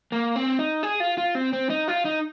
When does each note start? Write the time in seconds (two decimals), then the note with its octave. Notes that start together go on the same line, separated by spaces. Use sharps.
0.12 A#3
0.36 C4
0.59 D#4
0.83 G#4
1.00 F4
1.18 F4
1.35 C4
1.53 C4
1.70 D#4
1.88 F4
2.05 D#4